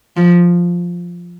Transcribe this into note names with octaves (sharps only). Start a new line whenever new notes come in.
F3